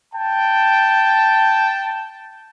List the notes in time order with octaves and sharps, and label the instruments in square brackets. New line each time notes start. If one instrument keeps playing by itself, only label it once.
[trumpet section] G5 A5